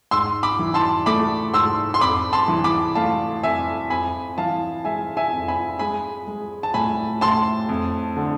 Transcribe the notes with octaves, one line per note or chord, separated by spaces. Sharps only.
G#2 C6 E6
B5 D6
E3
A5 C6
A3 B5 D6
G#2 C6 E6
C6
F2 B5 D6
A5 C6
E3
B5 D6
A3 F5 A5
F2 E5 G#5
F2 G#5 B5
E3 F5 A5
G#3 E5 G#5
E5 G#5
F2
G#5 B5
G#3 G#5 B5
G#3
A5
A2 G#5 B5
A2 A5 C6
F2
D3